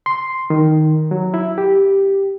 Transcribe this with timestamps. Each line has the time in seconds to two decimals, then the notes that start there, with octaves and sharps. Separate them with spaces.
0.06 C6
0.50 D#3
1.11 F#3
1.34 E4
1.58 G4